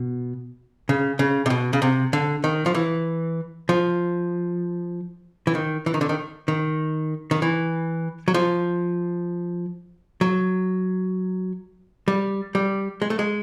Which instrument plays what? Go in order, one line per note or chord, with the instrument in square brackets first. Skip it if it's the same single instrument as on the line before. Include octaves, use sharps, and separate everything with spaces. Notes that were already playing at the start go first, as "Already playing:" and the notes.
Already playing: [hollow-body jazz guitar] B2
C#3
C#3
C3
B2
C#3
C3
D3
D#3
F3
E3
F3
E3
D#3
E3
D#3
D3
D#3
D#3
D#3
E3
F#3
F3
F#3
G3
G3
G#3
A3
G#3